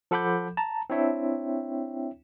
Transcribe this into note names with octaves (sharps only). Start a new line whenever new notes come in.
F3 A4 F#5 B5 D6 G6
A5 A#5
C4 D4 E4 C#5 E5 G5